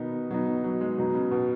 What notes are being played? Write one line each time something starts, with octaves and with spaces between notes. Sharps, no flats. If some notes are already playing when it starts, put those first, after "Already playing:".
Already playing: B2 D#3 B3 D#4
B2 F#3 B3 D#4
F#3
F#3
G#3
B2 F#3 B3 D#4
C#3
B2